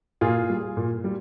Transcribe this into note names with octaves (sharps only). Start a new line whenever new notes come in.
A#2 F4 G#4
G3
A#2
G3